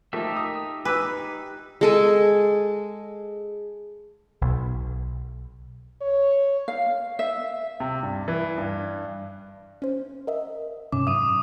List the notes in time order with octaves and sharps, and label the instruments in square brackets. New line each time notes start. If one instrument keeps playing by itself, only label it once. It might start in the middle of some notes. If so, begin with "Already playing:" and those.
[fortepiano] F3 A3 A#3 [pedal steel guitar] D#4 G4 E5
[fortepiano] D#6
[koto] B4 [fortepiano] G#5 D6 E6
[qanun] G#3 A4 G#5
[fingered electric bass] B1
[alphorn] C#5
[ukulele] F5
E5
[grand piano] C3
G2
E3
G2
[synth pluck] C#4 C5
A#4 D#5 E5
[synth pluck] G2 C3 C#4 [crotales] D6
[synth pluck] G#2 F#3 E5 [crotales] D#6 D#7